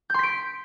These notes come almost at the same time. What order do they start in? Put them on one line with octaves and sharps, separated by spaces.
G6 C6 B6 D7